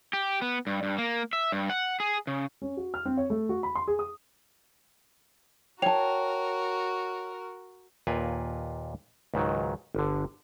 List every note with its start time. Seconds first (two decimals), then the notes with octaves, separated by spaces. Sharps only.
0.13 G4
0.42 B3
0.67 G2
0.83 G2
0.98 A#3
1.33 E5
1.52 G2
1.70 F#5
2.00 G#4
2.27 C#3
2.62 C#4
2.77 F#4
2.94 F6
3.05 C4
3.17 C#5
3.30 A3
3.49 F#4
3.63 B5
3.75 C6
3.88 G#4
3.99 D#6
5.82 F#4 A#4 C#5 G5 A5 F7
8.07 D#2 A#2 F4 A#4 B4 G#5
9.34 C#2 G#2 D#3 F#3
9.95 G1 D3